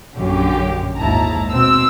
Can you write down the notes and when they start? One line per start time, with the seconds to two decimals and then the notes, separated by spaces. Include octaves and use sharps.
0.15 A#1 F#2 D3 C#4 G4
0.98 G#1 D#2 G#2 E4 A5 A#5
1.51 B2 C4 E6